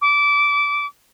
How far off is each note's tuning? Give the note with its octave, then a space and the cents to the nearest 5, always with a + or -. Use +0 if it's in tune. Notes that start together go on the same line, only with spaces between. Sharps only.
D6 -20